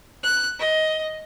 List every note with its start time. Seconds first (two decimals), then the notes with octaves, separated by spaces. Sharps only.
0.23 F#6
0.59 D#5